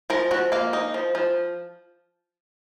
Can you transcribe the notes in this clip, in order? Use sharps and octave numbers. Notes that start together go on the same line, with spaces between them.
F3 A#4
F3 F#4
A#3 F5
D#4
F3
F3